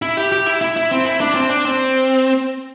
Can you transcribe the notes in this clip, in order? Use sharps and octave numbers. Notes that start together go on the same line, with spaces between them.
E4
G4
G4
E4
E4
E4
C4
E4
D4
C4
D4
C4